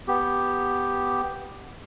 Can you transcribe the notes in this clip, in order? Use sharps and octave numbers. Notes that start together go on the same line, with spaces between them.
B3 G4